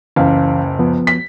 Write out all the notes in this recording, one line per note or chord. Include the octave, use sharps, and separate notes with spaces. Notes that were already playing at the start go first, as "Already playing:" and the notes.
F#1 C#2 E3 F5
F3 B3
B6